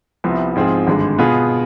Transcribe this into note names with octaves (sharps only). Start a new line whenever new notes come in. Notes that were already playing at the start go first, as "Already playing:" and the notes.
C2 C3 F3 B3
G#2 F3 C4 F4 G#4
G#1 G2 D3 G#3
B2 B3 F4 G#4